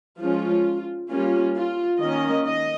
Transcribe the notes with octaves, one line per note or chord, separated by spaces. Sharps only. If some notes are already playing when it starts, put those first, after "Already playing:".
F3 G#3 C#4 F4
G3 A#3 C#4 F4
F4
D#3 A#3 C#4 D#5
D#5